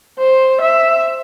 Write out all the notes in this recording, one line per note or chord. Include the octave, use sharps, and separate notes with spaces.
C5
E5